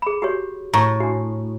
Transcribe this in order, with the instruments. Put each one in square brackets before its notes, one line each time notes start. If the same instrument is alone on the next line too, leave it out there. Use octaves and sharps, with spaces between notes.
[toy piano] G#4 B5
F#4 G4 C#5
[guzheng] A2 [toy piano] A#5 C#6
[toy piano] D4 F#4